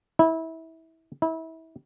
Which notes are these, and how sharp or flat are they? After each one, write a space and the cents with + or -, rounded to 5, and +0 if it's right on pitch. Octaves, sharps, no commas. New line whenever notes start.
E4 -25
E4 -30